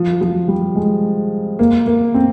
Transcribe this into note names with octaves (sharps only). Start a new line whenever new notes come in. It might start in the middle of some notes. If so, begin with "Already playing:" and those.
Already playing: F3
F3
G3
G#3
A#3
A#3
C4